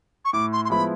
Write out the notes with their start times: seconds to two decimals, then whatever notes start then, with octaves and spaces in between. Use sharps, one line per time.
0.25 C#6
0.33 A2 D6
0.52 C6
0.65 C6
0.70 F3 G#3 B3 E4 B5